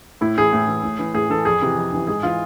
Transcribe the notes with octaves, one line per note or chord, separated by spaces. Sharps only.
A2 E4
E3 G#4
A2
E3
A2
E3
A2 G#4
E3 A4
F2 G#4
C3 E3
F2
C3 E3
G#2 G#4
E3 F4